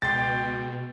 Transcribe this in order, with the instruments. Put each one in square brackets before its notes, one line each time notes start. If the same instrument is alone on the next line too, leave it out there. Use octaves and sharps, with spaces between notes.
[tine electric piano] C#2 G#3 C6 [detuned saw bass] B2 [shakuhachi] G5 [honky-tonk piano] A6